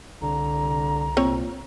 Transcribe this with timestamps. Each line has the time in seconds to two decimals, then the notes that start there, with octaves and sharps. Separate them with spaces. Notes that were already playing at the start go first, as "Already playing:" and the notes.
0.22 C2 D3 A#5
1.17 A#2 C4 C#5